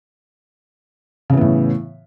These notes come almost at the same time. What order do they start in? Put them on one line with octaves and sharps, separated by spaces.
C#3 E3 B3 A2